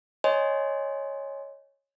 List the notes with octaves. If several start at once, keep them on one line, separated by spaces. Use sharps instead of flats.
C#5 D#5 G#5 C6